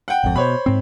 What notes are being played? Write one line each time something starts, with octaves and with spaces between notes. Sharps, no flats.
F#5 G5
G#1 F2
B2 C5 C#5 B5
G#2 C4